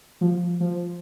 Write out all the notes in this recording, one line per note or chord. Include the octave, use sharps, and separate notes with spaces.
F3
F3